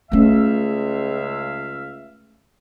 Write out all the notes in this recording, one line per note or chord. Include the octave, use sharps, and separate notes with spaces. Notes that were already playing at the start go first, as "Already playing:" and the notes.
C#2 A3 C#4 E5 F5